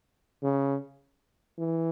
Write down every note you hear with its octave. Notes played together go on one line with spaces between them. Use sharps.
C#3
E3